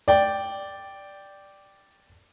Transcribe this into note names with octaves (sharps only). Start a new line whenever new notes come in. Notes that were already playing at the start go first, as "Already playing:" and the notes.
D5 G5